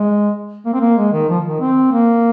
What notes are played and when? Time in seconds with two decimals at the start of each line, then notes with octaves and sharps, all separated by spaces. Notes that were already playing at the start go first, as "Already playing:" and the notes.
Already playing: G#3
0.65 A#3
0.74 C4
0.81 A#3
0.98 G#3
1.12 D#3
1.29 F3
1.49 D#3
1.60 C4
1.92 A#3